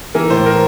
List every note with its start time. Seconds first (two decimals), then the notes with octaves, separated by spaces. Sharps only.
0.14 E3 A#4
0.30 A2 C5
0.46 A#4